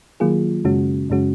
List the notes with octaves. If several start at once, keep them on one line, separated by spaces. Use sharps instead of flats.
D#3 F#3 A#3 F4 G#4
F#2 C#3 G#3 C#4 F#4
F#2 C#3 G#3 C#4 F#4